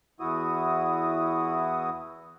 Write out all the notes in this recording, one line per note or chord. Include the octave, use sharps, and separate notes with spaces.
E2 E4 F#4 D#6